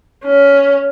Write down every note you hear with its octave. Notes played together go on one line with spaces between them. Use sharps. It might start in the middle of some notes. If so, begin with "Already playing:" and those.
C#4